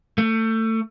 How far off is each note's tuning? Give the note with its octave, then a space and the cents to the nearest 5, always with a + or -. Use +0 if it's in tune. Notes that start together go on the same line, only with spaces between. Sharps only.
A3 +25